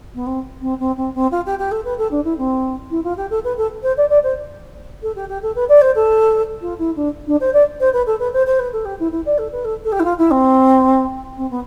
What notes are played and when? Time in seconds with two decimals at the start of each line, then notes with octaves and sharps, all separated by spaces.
0.15 B3
0.27 C4
0.62 C4
0.80 C4
0.97 C4
1.15 C4
1.32 F4
1.46 G4
1.59 G4
1.71 A4
1.85 B4
1.98 A4
2.11 D4
2.25 E4
2.38 C4
2.91 E4
3.04 F4
3.17 G4
3.30 A4
3.44 B4
3.58 A4
3.83 C5
3.97 D5
4.10 D5
4.23 C5
5.03 A4
5.16 G4
5.29 G4
5.43 A4
5.56 B4
5.69 D5
5.82 C5
5.95 A4
6.62 F4
6.79 E4
6.96 D4
7.27 D4
7.41 C5
7.53 D5
7.80 C5
7.93 B4
8.07 A4
8.19 B4
8.33 C5
8.47 C5
8.59 B4
8.73 A4
8.85 G4
9.00 E4
9.12 E4
9.26 D5
9.38 A4
9.52 B4
9.65 A4
9.84 A4
9.92 G4
10.00 E4
10.05 F4
10.18 E4
10.31 C4
11.37 C4
11.50 B3